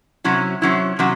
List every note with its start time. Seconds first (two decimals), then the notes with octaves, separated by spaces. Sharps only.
0.24 C3 F#3 C#4 E4
0.62 C3 F#3 C#4 E4
0.99 C3 F#3 C#4